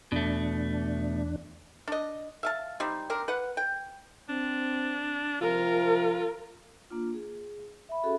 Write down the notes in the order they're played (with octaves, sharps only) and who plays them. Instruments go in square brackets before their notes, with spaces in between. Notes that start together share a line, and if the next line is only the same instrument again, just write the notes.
[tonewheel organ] E2 D4 [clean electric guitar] B2 A3
[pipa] D4 D#5
E5 F5 A5
G3 C4 D#4
C4 D4 A#4
B4 F#5
G5
[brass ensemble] C4 [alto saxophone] D4
[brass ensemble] C3 F3 [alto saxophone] F4 [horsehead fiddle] A#4
[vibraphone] A#3 D4 F4
G#4
E5 B5
C#4 F#4 G#4 A4 E5